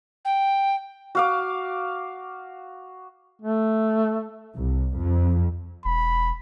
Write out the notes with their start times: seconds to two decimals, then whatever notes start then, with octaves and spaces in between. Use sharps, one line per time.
0.25 G5
1.15 F#4 F5 D6
3.42 A3
4.55 C2
4.98 F2
5.85 E1 B5